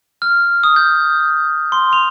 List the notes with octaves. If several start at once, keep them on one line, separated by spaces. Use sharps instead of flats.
F6
D#6
G6
C6
F7